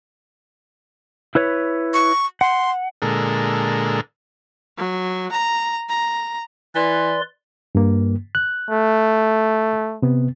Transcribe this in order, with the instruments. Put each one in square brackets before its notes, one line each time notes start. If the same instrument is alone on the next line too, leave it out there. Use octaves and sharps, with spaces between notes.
[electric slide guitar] E4 B4 C#5
[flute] C#6
[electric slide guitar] F#5 [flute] C6
[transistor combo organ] A#2 D3 G#3 A4 A#4
[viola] F#3
A#5
A#5
[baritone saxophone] E3 [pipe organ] B4 D5 C6
[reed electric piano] G2 A#3
F#6
[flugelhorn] A3
[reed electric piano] C3 B3